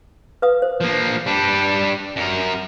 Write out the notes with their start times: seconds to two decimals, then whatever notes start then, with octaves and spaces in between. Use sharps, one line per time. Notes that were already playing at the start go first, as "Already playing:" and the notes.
0.42 B4 F5 D#6
0.62 C5
0.81 F3 A#3
1.26 G3 D4
2.16 F#2 A#4